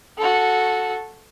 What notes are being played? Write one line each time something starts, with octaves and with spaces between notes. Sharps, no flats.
F#4 A4